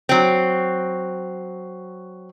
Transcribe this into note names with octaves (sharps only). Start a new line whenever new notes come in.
F#3 C4